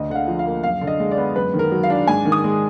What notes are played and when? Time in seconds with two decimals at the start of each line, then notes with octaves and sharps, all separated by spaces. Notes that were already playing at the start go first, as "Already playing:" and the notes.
Already playing: D2 D#5
0.09 D3 F#5
0.15 F5
0.27 F3
0.39 F5
0.46 A#3
0.63 F#2 F5
0.81 D3
0.87 D#5
1.00 G#3
1.12 D5
1.18 B3
1.36 F#2 B4
1.54 D#3
1.59 A#4
1.72 F#3
1.83 F5
1.90 D4
2.07 G#2 G#5
2.25 D#3
2.32 D#6
2.44 G#3